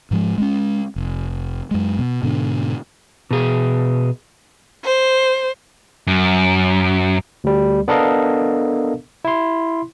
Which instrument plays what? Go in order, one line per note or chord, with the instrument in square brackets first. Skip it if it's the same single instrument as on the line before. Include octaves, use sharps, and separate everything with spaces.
[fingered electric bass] G#2 F3 G#3
G#3 A#3 C#4
F1
F#2 G#3
B2
G#2 B2 D3
[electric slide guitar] B2 G#4
[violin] C5
[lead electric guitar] F#2
[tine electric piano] D2 G3
B3 D4 A4 A#4 D#5 F5
E4 C6